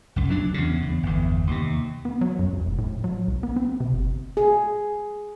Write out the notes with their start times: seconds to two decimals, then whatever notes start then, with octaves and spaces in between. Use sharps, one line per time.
0.16 C2 F#2
0.28 D1 F#3 D4
0.54 E2 C#3
0.82 E2
1.03 G1 E2
1.47 D#2 C3
2.05 B3
2.21 F#3
2.39 F#2
2.53 F2
2.66 F1
2.78 A2
3.04 F#3
3.27 C2
3.43 B3
3.56 C4
3.80 C3
3.92 G1
4.37 G#4